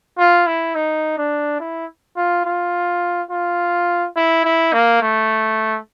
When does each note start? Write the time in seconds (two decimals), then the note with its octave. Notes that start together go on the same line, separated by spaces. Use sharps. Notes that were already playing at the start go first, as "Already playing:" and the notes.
0.18 F4
0.47 E4
0.75 D#4
1.18 D4
1.60 E4
2.17 F4
2.45 F4
3.31 F4
4.16 E4
4.44 E4
4.73 A#3
5.01 A3